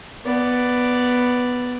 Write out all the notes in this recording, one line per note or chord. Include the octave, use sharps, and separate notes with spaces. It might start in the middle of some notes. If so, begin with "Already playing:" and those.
B3 D5